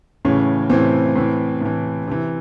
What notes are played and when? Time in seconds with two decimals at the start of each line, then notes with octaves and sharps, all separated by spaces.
0.25 A2 C#3 E3 C#4
0.70 A2 C3 E3 C4
1.16 A2 E3
1.61 A2 E3
2.07 C3 E3